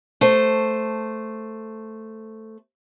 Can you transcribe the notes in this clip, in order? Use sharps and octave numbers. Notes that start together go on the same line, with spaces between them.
A3 C5